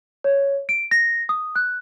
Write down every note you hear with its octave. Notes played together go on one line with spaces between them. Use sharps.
C#5
D7
A#6
D#6
F#6